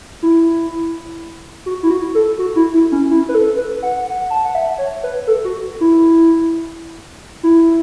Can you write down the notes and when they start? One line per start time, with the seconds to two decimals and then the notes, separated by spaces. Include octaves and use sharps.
0.23 E4
1.66 F#4
1.83 E4
1.90 F#4
2.15 A4
2.39 F#4
2.56 E4
2.74 E4
2.92 C#4
3.11 E4
3.29 B4
3.35 A4
3.58 B4
3.82 F#5
4.07 F#5
4.30 A5
4.45 F#5
4.55 E5
4.78 C#5
5.03 B4
5.27 A4
5.45 F#4
5.81 E4
7.43 E4